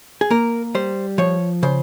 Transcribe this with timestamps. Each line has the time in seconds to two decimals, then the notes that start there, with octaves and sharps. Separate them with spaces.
0.21 G#4
0.30 A#3 A#4
0.75 G3 C5
1.18 F3 C#5
1.63 C#3 C5